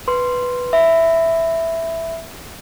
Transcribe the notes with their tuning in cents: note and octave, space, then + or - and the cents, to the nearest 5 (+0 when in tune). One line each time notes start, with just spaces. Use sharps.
B4 +0 C6 +0
E5 +0 B5 +15